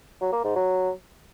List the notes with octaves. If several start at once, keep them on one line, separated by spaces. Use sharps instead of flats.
F#3
A#3
G#2
F#3